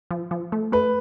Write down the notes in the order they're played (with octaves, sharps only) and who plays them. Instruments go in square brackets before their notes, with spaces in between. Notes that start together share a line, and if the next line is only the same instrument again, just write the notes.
[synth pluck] F3
F3
A3
[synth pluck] A3 [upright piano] B4